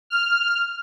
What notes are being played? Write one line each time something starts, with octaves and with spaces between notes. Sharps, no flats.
F6